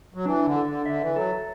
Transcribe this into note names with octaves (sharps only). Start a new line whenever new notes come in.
F#3
E3 D4
D3
A4
D3
D3 E5
E3
F#3 A4